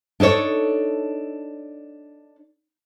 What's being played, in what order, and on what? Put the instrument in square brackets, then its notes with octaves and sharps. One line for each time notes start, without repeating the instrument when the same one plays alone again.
[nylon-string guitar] D4 D#4 A4 C#5